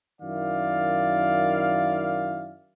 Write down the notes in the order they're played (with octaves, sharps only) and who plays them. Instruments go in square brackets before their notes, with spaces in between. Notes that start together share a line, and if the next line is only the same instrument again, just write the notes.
[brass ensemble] F#2 D#3 E4 D5 F5